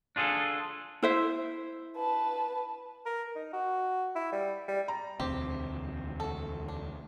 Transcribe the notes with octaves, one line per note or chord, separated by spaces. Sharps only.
D4 F4 G#4 A4
E4 C5 E5
B4 A5
A#4
D#4
F#4
E4
G3
G3
A#5
E1 D2 C4 G4
F#4 A4
D4